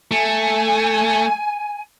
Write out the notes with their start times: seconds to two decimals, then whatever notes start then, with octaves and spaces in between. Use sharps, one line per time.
0.11 A3 G#5